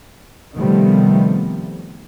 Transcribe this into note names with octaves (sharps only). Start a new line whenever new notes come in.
C3 D#3 F3 G3 A3 B3